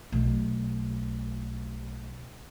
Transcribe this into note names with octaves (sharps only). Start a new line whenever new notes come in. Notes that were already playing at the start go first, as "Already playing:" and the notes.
B1 A3